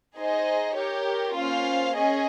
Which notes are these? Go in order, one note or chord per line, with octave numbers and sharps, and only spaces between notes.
D#4 G#4 C5 D#5
G4 A#4 C#5
A#3 C#4 F4 C5 F5
C#4 G#4 D#5 G#5